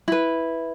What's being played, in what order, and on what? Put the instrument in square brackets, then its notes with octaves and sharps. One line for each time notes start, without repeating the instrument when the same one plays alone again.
[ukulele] E4 B4